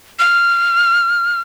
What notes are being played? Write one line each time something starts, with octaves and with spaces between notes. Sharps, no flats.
F6